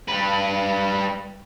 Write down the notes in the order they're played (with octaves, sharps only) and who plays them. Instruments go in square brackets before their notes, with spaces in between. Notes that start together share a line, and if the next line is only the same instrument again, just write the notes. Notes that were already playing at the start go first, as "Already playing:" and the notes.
[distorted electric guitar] G3 B4